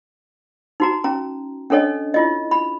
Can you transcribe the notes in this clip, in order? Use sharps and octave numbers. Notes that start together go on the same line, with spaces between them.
D#4 F#4 A#5
C#4 A#5
C#4 D4 A4 C#5 D#5
E4 F4 D#5
B5